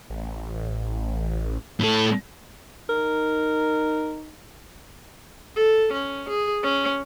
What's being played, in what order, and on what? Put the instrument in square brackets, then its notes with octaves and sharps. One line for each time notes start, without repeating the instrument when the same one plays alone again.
[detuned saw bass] A1
[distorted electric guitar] A2 A4
[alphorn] D#4 [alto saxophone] A#4
[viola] A4
C#4
G#4
C#4